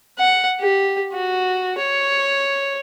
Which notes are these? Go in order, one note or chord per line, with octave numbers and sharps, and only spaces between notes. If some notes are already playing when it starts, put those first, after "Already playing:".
F#5
G4
F#4
C#5